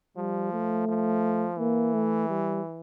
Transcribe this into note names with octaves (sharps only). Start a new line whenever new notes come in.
F3 G3
A3
F3
E3 A#3
A3
G3